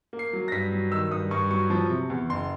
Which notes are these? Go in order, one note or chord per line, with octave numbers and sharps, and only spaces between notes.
A#3
C7
F#3
A#6
G2 B6
F#3
D#3 E6
G2 D#6
G2 C#6
F#3 C#6
F3
C3
E2
F#1 C6